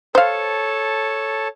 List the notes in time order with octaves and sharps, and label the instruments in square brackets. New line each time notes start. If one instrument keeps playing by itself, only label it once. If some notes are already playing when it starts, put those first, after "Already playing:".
[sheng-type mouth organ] A4 C#5 A5 [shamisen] C5 F5